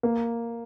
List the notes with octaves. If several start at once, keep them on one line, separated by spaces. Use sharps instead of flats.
A#3